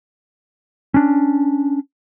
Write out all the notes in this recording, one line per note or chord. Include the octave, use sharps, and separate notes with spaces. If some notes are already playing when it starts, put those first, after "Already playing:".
C#4 D4